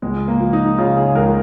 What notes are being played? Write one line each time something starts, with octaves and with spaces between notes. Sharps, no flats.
C#2 G#3
A#3
F3
D#4
C#3 F4
G#4
C#2 A#4